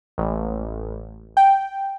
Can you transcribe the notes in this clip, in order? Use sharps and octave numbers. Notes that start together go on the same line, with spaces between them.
A1
G5